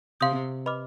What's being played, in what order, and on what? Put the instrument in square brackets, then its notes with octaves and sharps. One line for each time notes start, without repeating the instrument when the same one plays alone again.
[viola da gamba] C3 [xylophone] F5 C6 D#6 G6
[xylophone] B4 D#5 B5 D6 F6